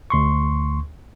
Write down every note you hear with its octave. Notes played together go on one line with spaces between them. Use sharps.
D2 C6 C#6